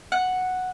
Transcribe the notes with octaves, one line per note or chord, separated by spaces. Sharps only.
F#5